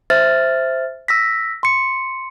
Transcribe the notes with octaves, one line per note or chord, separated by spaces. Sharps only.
C5 E5 F6 A6
E6 A#6 B6
C6 C#7